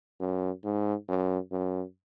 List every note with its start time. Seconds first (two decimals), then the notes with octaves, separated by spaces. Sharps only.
0.20 F#2
0.64 G#2
1.08 F#2
1.52 F#2